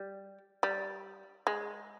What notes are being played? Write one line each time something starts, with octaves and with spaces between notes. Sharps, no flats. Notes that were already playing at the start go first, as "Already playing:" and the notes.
Already playing: G3
G3
G#3